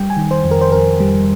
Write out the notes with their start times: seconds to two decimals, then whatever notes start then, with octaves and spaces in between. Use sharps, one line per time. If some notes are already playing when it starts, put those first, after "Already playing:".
Already playing: G3 G5
0.10 G#5
0.17 D#3
0.31 C5
0.45 F2
0.51 A#4
0.61 C5
0.72 F2 A#4
1.00 G3